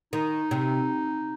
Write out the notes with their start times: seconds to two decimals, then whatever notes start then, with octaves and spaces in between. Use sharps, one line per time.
0.13 D#3 D#4
0.51 C3